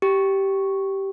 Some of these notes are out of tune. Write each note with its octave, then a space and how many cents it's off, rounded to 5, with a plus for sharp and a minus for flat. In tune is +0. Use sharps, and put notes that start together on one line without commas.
G4 -10